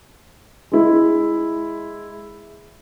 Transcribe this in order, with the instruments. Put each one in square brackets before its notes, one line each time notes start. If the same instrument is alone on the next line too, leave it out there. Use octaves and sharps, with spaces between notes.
[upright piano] G#3 E4